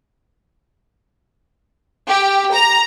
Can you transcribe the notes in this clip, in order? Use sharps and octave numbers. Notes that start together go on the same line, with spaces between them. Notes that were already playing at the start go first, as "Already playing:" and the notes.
G4
A#5